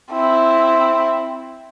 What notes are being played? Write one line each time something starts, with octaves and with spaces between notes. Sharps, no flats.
C4 E4